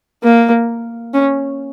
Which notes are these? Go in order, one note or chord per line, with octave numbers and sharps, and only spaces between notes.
A#3
C#4